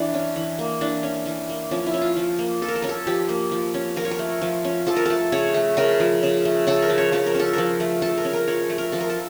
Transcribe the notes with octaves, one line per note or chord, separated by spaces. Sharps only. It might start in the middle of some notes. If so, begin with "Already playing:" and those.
Already playing: E3 D4
C#4
E3
A#3
E3 D4
C#4
E3
A#3
F3 C#4
E4
C#4
F4
F3
A#3
F3 A4
A#4
A4
C#4 A#4
A4
F3 G4
A#3
F3
C#4
F3 A#4
C#5
A#4
A3
F3
C#4
F3 A4
A#4
A3 A4
C#3 C#5
A3
C#3 A#4
F3
C#3
A3
C#3 A4
A#4
F3
C#5
F3 C#5
A#4
C#4 A4
F3 A#4
A3
F3 A4
A#4
C#4
A#4
F3 C#5
A3
A#4
F3 A4
A#4
A4